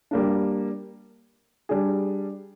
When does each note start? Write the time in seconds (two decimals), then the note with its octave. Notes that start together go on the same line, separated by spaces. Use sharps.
0.11 G3 A#3 D4
1.69 G3 D4 G#4